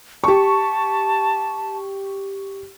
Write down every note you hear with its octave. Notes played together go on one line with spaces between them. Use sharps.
G4 A5 C#6